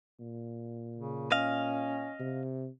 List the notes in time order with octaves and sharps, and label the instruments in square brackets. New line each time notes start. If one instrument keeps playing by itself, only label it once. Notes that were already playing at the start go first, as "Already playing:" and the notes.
[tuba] A#2
[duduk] C#3
[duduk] C#4 [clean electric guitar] D#5 F5
[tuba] C3